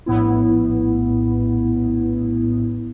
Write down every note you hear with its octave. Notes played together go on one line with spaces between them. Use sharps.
A#1 A2 B3 E4